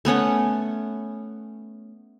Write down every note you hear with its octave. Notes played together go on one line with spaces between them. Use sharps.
A3 B3 C#4 F#5